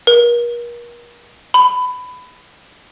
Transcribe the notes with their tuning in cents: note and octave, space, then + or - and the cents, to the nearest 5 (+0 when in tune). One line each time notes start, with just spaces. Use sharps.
A#4 +40
B5 +20